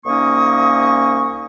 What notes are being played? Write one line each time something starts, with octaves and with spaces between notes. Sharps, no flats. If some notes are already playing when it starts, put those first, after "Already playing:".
C2 A#3 C#4 D#4 C#6 D#6